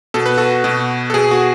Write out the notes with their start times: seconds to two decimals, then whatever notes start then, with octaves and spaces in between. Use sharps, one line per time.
0.14 B2 A4
0.26 B4
0.38 F#4 A4
0.64 B2
1.10 A4
1.14 B2 G#4
1.31 F#4